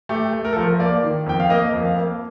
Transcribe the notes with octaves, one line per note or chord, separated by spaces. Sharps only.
A3 G4
A3
A#4
A4
F3 A#4
A#3 D5
D#3
F2 G5
F5
A#3 D#5
F2
F5
A#3